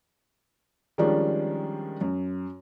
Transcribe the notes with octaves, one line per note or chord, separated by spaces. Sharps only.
D#3 F3 G3 G#3 C#4 D4
F#2